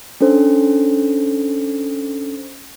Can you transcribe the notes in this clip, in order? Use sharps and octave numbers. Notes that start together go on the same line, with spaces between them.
C#4 D4 A4 C5